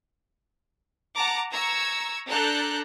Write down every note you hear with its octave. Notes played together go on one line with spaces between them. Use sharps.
F#5 A5 A#5 D6
A#5 C#6 E6 G#6
D4 A4 A#5 F#6 G6